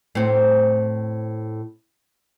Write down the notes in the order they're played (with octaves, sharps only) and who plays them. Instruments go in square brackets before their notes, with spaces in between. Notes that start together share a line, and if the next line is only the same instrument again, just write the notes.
[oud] A2 C4